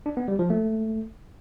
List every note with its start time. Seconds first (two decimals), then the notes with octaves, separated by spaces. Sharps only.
0.06 D4
0.17 B3
0.28 G3
0.39 F3
0.50 A3